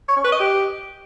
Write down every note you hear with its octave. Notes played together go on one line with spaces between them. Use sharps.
C#5
C#4
B4
D#5
G4